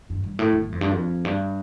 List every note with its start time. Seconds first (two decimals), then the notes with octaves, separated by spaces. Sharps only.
0.10 G2
0.24 G2
0.39 A2
0.52 F2
0.62 G2
0.72 F2
0.81 G2
0.91 F2
1.25 G2